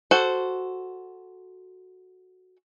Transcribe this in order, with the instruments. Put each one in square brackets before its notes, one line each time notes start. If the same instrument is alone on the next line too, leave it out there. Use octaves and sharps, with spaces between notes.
[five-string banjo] F#4 A4 C5